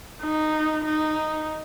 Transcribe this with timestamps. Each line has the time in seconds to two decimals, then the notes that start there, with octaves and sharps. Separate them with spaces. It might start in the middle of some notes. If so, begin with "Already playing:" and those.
0.22 D#4
0.85 D#4